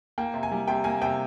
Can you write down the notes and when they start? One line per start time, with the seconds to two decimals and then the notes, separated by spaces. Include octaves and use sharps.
0.18 A#3 G5
0.34 C3
0.43 G#5
0.52 G3
0.67 C3 G5
0.84 A#3 G#5
1.02 C3 G5